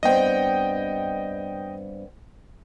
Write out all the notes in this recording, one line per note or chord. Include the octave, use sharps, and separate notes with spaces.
G2 B3 C4 D#5 G5